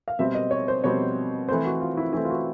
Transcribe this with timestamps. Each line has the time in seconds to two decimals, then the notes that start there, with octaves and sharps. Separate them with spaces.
0.08 F5
0.19 B2 G3 C4 E5
0.35 D#5
0.51 C#5
0.68 C5
0.84 B2 G3 C4 C#5
1.48 E3 A3 C4 C5
1.65 F#4
1.81 F4
1.97 E4
2.13 E3 A3 C4 E4
2.25 F4
2.30 F#4